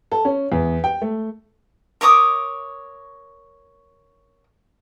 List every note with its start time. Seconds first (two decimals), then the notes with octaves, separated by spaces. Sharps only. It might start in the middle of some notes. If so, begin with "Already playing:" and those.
0.12 A4
0.25 C#4
0.52 E2
0.84 G5
1.02 A3
2.01 A#4 C#5 D6 D#6